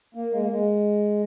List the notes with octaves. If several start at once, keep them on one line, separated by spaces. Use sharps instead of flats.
A#3
G#3
A#3
G#3